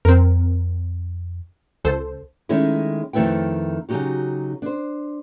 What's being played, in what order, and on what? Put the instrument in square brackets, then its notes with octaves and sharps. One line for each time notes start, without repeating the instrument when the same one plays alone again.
[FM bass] F2 [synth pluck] C4 A#4
[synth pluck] C#2 A4 C5
[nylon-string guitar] D#3 G#3 A3 C#4 D#4 E4
F2 D#3 A3 E4 B4 G5
C#3 F#3 A#3 D#4 F#4 G4
D4 C5